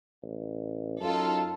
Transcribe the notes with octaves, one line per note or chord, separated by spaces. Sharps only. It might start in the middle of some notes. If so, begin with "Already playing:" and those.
A1
F#2 D#4 F4 A4